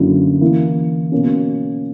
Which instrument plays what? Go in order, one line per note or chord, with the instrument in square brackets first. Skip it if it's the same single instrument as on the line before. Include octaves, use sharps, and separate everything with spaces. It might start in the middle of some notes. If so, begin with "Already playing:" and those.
Already playing: [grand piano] F#2 D3 F#3 A#3 E4
E3 A#3 E4
B2 A#3 C#4